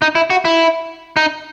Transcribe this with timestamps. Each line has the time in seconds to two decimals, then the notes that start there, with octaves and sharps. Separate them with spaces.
0.02 D#4
0.15 E4
0.30 F#4
0.45 E4
1.17 D#4